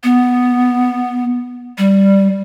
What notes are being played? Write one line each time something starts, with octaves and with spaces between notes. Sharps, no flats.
B3
G3